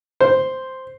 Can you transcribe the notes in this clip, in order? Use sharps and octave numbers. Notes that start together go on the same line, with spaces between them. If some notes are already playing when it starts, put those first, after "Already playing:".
C5